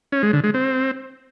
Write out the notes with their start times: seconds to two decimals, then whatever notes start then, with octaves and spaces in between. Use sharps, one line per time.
0.12 C#4
0.23 G#3
0.33 D3
0.44 G#3
0.54 C4